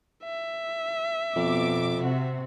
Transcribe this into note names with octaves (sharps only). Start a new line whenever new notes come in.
E5
F2 B2 D6
C3 F#4